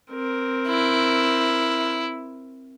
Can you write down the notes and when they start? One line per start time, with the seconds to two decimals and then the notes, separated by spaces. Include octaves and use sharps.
0.12 C4 A#4
0.68 E4